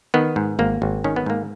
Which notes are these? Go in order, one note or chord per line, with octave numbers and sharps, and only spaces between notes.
D#3 B3
G#2
G#1 A#3
G#1
D#3 C#4
B3
G#2 A#3